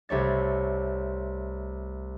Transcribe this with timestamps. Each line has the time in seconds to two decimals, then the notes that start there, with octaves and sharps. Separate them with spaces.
0.09 C2 A3 C#5 A6